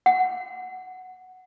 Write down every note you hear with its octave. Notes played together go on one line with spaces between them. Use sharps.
F#5